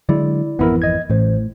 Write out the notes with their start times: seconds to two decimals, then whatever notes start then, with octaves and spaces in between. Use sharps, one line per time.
0.09 D3 F#3 G#3 E4 D5
0.59 G#1 F2 E3 B3 E4 A#4
0.82 D#5 G#6
1.10 A1 A2 C5